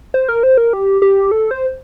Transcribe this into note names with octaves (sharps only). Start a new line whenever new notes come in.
C5
A#4
C5
A#4
G4
G4
A4
C5